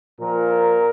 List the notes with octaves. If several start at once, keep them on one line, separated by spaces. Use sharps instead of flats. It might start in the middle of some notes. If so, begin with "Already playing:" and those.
A#2 F3 A#4